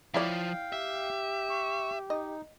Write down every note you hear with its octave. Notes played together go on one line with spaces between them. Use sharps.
F3 E4 C#5 D5 F5 G5
G4 E5
C#6
D#4 D#5